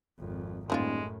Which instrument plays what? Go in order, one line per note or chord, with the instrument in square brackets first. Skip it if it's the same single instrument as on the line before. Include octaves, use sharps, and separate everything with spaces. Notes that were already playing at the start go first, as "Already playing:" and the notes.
[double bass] G#1 F2
[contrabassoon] D#1 [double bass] F#2 A2 [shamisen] G3 E4 F4 [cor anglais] G#3